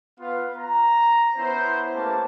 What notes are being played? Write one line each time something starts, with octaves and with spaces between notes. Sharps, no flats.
B3 F4 B4 F5
A#5
B3 C#4 E4 C5
A3 A#3 C#4 G4 B4 A5